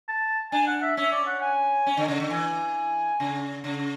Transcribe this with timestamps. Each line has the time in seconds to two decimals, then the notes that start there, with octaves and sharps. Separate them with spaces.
0.08 A5
0.52 D4 G#5
0.67 F#5
0.83 E5
0.97 C#4 E5
1.12 D5
1.27 F#5
1.42 G#5
1.86 C#4
1.97 D3
2.08 C#3
2.20 D3
2.30 E3 G#5
3.20 C#3
3.64 C#3